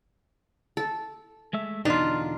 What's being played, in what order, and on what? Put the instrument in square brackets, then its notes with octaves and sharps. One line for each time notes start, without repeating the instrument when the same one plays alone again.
[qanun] A4
[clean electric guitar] G#3 A3 E5
[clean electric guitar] E2 B2 D3 [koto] D4 F4 [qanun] D#4